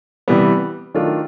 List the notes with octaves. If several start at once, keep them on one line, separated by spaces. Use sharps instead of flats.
C3 E3 G3 B3
D#3 F#3 A3 D4 F4